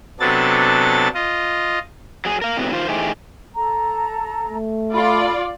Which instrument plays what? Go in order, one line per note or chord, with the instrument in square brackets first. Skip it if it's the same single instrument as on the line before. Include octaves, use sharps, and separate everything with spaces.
[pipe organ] C3 F#3 B3 D4 A4 A6
F4 D#5
[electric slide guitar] F#3 G#4
A#4 F5
A2 C3 F#3 B3
D#3 F4 C5
E3 A3 D#4 G4 G#4 C5
[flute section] A4 A#5
[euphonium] A3
[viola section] F4 D5 [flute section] A4 B5